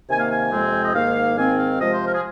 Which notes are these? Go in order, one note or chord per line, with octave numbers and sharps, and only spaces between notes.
C3 D#3 A#3 G#5
F5
G#5
F2 C3 G#3 C4
D#5
G#2 D#3 A#3 F5
G#2 D#3 C4 G#5
F5
C3 F3 G#3 D#5
C5
A#4
G#4